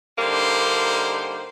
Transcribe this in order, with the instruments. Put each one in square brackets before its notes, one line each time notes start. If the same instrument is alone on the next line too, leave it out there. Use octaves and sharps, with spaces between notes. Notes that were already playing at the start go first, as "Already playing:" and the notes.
[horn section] D3 G3 A#3 D4 D#4 C5